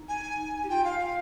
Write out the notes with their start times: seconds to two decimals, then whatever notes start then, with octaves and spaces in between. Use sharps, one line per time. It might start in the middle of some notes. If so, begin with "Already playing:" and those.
Already playing: D#4
0.08 G#5
0.63 G4
0.69 F4 G5
0.84 F5
0.99 F5